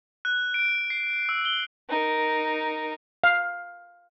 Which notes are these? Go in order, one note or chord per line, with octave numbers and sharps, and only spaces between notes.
F#6
D7
C7
E6
G7
D#4 A#4
F5